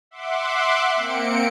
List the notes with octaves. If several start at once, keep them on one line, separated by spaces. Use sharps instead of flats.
E5 F#5 C6 D6
A#3 C4 C#7 D7